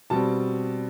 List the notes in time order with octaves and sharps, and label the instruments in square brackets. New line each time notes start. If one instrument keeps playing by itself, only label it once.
[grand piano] B2 G3 C4 A5